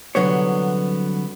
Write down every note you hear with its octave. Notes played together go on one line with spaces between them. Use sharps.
C2 D3 F#3 B3 C#5